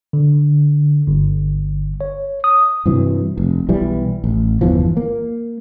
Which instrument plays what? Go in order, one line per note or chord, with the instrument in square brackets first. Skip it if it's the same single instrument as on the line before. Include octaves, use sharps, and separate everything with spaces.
[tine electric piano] D3
G1
C#5
D#6
[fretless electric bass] G2 C3 E3 F#3
F1
B1 E3 G3
A1
G1 E2 E3 F3
A#3